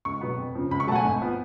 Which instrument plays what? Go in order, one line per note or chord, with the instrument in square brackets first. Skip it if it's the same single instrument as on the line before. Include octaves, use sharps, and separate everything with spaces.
[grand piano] C#2 C#6
B2 F#3 B3
F2
C#3 F3
C#2 B5
C#6
B2 F#3 A3 F#5 A5
G#5
G#1
F3 B3